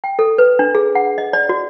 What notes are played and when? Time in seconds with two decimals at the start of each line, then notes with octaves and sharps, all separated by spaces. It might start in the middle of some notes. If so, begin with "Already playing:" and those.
0.04 G5
0.19 A4
0.38 B4
0.59 D4
0.75 G#4
0.95 F#5
1.18 D#5
1.33 D5
1.49 F#4